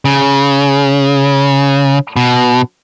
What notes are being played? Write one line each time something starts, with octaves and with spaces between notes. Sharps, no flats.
C#3
B2